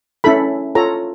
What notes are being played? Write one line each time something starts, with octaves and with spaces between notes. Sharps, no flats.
C#4 E4 A4 B5
F4 A4 C#5 A#5